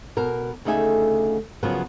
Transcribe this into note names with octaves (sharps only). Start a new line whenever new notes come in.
B2 A#4
D2 C#3 A3 D#4 E5 G#5
C#3 F3 F#3 B3 A#4